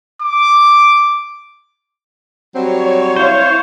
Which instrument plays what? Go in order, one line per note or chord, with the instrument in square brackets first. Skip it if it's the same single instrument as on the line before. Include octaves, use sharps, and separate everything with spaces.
[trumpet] D6
[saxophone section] F#3 G3 C4 [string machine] C#5
[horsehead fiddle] E4 F5 [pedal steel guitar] C5